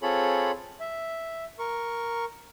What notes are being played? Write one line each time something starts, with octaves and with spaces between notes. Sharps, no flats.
C4 F4 G#4 A4 C#5 B5
E5
A#4 C#6